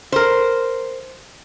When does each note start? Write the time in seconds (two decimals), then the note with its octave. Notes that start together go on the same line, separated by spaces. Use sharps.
0.12 A#4 C5